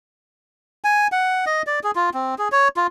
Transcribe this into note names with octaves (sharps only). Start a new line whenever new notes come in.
G#5
F#5
D#5
D5
G#4
F4
C4
G#4
C#5
F4